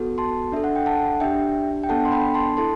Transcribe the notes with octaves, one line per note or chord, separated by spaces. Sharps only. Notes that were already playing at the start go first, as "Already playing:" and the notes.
Already playing: B3 F#4 A4
A5 C6
D4 A4 E5
F#5
G5
F#5 A5
D4 G4 E5 G5
G5
B3 D4 A4 F#5 A5
C6
G5 B5
A5 C6
E4 A4 A5 C6